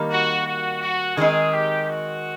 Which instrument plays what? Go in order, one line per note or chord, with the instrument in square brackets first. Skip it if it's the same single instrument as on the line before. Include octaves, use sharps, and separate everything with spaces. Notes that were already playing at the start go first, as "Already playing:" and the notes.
Already playing: [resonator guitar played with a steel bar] D#3 G3 A#3 D#4
[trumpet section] F#4
F#4
F#4
[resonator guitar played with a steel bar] D#3 G#3 C4 D#4 [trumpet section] G#4
[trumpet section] G4
F#4